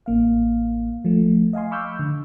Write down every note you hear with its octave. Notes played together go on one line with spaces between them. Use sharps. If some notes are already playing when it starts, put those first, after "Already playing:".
A1 A#3 F5
F3 A3
D#5 F5 G#5 C6
B5 C#6 D6 E6 F6 G6
D3